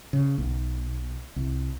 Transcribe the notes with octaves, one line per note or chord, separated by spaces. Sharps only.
C#3
B1
C2